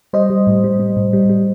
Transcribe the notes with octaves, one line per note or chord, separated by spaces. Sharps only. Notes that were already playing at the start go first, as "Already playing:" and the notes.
G3 C5 D#5
G3
A2
G3
G3
A2
G3
G3